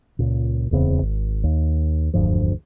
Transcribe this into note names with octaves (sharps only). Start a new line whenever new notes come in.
C#2 A#2
D1 E2 C#3 C4
G#1
D#2
E1 D2 G2 F3